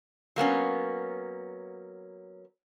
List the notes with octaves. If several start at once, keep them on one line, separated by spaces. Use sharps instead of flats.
F#3 A#3 B3 C#4